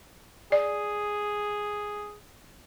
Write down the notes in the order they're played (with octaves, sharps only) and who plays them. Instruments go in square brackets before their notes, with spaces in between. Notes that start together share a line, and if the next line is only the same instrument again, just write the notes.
[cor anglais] G#4 [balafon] D5